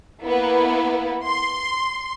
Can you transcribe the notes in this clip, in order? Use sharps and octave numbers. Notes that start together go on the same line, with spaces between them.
A#3 B3 E4
C6